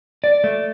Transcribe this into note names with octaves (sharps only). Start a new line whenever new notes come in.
D5
A3